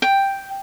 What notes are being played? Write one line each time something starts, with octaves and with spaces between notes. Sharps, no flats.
G5